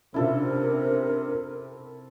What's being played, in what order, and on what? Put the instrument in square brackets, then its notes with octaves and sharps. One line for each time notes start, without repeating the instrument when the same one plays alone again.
[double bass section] C3 [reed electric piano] C#4 D4 F4 [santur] E4 A4 [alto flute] A#4